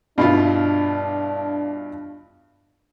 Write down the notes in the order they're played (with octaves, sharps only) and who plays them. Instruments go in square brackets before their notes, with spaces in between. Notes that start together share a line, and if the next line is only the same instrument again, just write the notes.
[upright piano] G2 [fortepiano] B2 E4 F4 [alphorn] D4